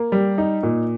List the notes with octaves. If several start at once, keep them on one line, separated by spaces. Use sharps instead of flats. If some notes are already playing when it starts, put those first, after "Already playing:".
Already playing: A#3
G3
D#4
A#2